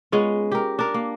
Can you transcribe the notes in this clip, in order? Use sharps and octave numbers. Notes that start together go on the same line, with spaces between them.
G#3 B3 C#4 F4
G4 A#4
D4 A#4
A#3